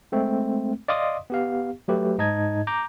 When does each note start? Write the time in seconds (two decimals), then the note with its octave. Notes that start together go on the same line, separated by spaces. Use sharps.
0.12 G#3 A3 C4
0.88 D5 D#5 F5 C6 D6 D#6
1.30 B3 G4 F5
1.88 F#3 A3 G4 B4
2.18 G#2 D#4 D#5 A5 G#6
2.67 A#5 D6 G6